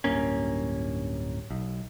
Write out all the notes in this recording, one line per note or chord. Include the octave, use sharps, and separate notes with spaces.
D1 G2 A#3 C#4
B1